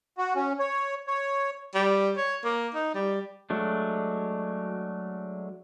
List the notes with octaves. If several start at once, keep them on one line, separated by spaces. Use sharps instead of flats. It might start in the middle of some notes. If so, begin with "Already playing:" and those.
F#4
C#4
C#5
C#5
G3
C#5
A#3
D#4
G3
F#3 G#3 A3 D4